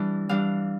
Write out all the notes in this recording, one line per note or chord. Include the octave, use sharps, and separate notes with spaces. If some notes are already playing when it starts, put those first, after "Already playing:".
Already playing: E3 G3 D4 E4
E3 G3 D4 F5